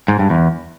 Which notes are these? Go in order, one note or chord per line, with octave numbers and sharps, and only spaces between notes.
G#2
G2
E2